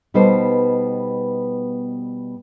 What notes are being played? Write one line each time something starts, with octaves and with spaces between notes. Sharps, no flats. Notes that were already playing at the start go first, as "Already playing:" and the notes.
B2 G3 B3 D#4 A4 C5